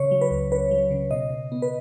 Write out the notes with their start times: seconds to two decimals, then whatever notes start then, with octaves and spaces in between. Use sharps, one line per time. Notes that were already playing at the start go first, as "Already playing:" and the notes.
Already playing: C#3 C#5
0.11 F#3
0.21 B4
0.31 C#2
0.51 C#2 B4
0.71 F#3
0.91 C#3
1.11 B2 D#5
1.31 B2
1.52 B3
1.62 B4